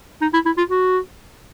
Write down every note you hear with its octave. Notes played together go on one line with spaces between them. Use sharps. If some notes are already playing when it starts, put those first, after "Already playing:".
D#4
E4
E4
F4
F#4